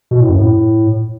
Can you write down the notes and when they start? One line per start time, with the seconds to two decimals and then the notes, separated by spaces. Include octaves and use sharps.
0.11 B2
0.20 A2
0.29 F#2
0.39 A2